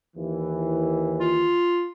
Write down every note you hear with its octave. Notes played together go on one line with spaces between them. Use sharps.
D#2 E3
F4